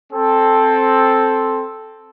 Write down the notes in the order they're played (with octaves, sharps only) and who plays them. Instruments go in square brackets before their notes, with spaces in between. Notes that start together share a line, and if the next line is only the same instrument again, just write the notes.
[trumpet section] C4 A4